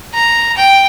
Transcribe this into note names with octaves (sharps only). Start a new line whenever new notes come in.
A#5
G5